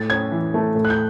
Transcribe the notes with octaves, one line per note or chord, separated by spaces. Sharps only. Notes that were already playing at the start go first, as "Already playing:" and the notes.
Already playing: A2 A6
C#4 G#6
E3
A3
A2
F#6
G6